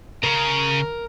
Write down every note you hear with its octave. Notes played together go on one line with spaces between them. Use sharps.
C#3 A#4